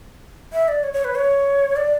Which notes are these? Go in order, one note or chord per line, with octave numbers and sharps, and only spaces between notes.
E5
D5
C#5
C#5
B4
C#5
D5